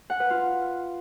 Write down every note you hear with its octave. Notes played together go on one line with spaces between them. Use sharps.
F#5
B4
F4